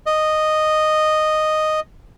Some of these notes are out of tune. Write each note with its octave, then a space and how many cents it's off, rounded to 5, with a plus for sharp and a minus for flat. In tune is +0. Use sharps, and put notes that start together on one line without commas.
D#5 -5